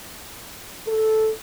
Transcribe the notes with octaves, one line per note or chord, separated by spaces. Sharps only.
A4